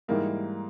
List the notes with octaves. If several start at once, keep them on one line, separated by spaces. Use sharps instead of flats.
G#2 E3 G3 A#3 D#4